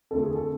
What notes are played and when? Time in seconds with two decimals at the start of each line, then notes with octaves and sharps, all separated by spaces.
0.11 F2 D3 A3 A4
0.23 G#4
0.35 A4